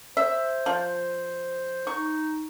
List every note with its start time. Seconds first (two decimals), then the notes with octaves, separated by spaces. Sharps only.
0.17 C5 E5
0.66 F3
1.87 D#4 C#6